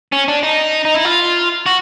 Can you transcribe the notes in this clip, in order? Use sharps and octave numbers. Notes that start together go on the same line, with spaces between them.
C#4
D4
D#4
D#4
E4
F4
F#4